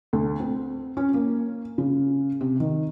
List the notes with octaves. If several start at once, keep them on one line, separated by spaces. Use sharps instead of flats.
D2
C4
C#4
A#3
C#3
C3
D#3